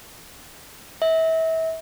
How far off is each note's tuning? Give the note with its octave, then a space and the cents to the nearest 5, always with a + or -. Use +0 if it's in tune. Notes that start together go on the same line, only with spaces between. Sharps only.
E5 -35